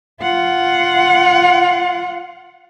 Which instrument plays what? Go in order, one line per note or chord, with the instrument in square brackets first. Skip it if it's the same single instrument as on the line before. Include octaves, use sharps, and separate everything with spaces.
[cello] F4 F#5